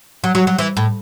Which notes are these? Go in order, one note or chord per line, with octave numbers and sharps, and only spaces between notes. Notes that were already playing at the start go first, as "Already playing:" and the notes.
F#3
F#3
F#3
E3
A2